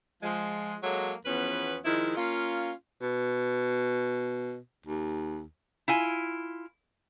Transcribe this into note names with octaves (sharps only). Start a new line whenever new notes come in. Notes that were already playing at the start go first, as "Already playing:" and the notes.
F3 G#3
F#3 G#3 A#3 A4 C#5
E2 F3 B3 C#4 B4
D#3 F3 G#3 E4
A#3 C#4 F4
B2
D#2
E4 F4 G#5